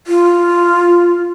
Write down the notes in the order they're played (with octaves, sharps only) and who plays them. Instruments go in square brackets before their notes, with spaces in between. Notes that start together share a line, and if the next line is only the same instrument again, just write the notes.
[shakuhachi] F4